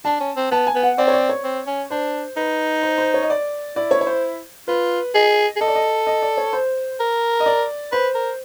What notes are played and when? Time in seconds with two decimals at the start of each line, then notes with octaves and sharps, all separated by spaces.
0.05 D4 A5
0.20 C#4
0.36 C4
0.51 B3 A5
0.67 G#5
0.75 B3
0.83 F#5
0.98 C4 D5
1.08 C#5
1.13 D5
1.29 C#5
1.44 C4
1.67 C#4
1.90 D4 C5
2.37 D#4 B4
2.83 C5
2.98 C5
3.14 C#5
3.23 D#5
3.30 D5
3.76 E4 D5
3.91 C#5
4.01 C#5
4.07 C5
4.68 F4 B4
5.15 G#4 D#5
5.56 G#4
5.61 A4 D#5
5.68 D5
5.75 D#5
6.07 D#5
6.22 D5
6.37 C#5
6.53 C5
7.00 A#4
7.40 D#5
7.46 D5
7.92 B4 C5
8.15 A#4